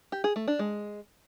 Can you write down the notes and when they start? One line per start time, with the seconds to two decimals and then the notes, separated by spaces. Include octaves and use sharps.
0.12 G4
0.24 G#4
0.36 A3
0.48 D4
0.59 G#3